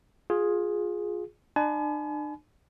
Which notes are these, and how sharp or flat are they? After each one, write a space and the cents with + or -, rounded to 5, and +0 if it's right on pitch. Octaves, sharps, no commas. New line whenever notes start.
F4 +20 G#4 +0
D4 +40 G#5 +40 B5 +30